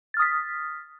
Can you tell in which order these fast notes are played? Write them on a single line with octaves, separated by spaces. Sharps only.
A6 F6 D#6 B6